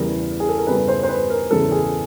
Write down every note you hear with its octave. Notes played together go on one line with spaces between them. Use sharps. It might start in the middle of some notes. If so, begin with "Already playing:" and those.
Already playing: E2 C#3 E3 G3 A#4
G#4
A4
A#4
E2 C#3 E3 G3 B4
C5
C5
B4
A#4
E2 C#3 E3 G3 A4
G#4